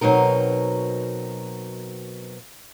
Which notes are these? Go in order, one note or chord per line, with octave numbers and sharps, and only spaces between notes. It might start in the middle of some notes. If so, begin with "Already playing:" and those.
B2 F#3 C4 D#4 A#4